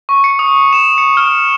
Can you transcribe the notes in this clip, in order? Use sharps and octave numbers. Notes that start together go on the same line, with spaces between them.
C#6
C#7
D#6
E7
C#7
F6